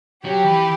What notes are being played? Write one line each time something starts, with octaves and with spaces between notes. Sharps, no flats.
F#3 G4
E3